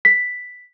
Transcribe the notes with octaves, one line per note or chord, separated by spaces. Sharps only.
B6